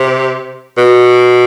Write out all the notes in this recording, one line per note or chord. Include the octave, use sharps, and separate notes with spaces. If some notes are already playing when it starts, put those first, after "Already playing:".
Already playing: C3
B2